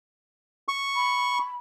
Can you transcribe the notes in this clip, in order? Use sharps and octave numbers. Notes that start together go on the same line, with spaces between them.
C#6
B5